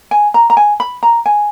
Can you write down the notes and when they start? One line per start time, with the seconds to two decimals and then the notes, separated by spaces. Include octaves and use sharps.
0.11 G#5
0.34 A#5
0.50 A#5
0.57 G#5
0.80 B5
1.03 A#5
1.26 G#5